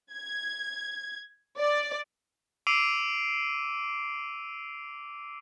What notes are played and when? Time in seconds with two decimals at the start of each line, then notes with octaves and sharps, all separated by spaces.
0.12 G#6
1.58 D5
2.67 D6 E6 C7 D7 D#7 F7